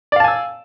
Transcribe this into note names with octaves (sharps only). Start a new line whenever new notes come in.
D5 F5 G#5 A5 E6